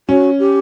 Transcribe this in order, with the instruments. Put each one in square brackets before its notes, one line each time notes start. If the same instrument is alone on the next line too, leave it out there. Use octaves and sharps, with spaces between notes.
[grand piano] C#4 [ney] F#4
[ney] G4